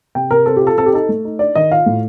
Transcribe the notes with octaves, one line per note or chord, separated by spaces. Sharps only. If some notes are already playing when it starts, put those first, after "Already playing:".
C3 G5
C3 A#4
C4 A4
G4
F4
A4
C4 A4
G4
D#4 A4
A3
D#4
D4 D5
D#3 D#5
F4 F5
A2